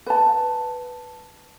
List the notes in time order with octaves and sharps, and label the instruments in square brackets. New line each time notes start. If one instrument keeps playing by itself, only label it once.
[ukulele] B4 A5